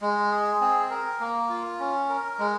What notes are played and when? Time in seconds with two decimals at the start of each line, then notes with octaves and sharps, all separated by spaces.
0.01 G#3
0.32 G#4
0.61 C4
0.90 A#4
1.20 A#3
1.49 F4
1.79 C#4
2.09 A#4
2.39 G#3